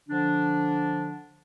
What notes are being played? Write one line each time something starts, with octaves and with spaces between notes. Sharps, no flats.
D3 F3 D4